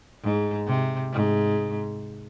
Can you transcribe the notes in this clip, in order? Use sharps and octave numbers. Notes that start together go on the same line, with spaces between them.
G#2
C3
G#2